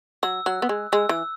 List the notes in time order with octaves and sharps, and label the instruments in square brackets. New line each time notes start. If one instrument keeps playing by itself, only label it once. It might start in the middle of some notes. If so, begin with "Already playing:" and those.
[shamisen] F#3 [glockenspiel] E6
[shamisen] F#3 [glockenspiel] F#6
[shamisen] B3
G#3
[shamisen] G#3 [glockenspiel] E6
[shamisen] E3 [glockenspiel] E6